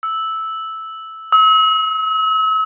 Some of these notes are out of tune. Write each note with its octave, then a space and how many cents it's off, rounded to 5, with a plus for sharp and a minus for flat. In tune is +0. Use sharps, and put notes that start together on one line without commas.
E6 -10
E6 -40